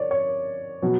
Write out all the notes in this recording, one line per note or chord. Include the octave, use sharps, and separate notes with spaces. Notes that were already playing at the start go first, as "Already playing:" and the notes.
Already playing: C#5 D5
C#5
B2 F#3